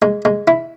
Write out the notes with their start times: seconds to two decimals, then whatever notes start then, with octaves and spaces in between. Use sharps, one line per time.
0.02 G#3
0.25 G#3
0.48 E4